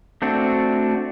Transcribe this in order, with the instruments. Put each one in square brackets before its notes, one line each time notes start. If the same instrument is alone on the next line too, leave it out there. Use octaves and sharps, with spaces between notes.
[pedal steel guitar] A3 C4 D4 F#4